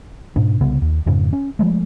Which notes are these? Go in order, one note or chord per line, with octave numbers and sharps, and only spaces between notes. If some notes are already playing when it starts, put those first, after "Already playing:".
G#2 B2 D4
C2 C#3 B3
D#2
F2 G#2 C#3
C#4
F3 G#3 A3